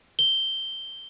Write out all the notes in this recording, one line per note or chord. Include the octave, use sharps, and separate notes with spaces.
G7